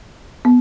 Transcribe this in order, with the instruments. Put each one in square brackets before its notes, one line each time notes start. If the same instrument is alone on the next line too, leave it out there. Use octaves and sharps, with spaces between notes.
[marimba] B3